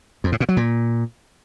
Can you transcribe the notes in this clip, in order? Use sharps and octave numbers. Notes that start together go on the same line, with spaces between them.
F2
A2
A#2
F#3
A#2